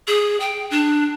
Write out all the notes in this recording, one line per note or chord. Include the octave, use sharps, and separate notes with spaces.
G#4
G5
D4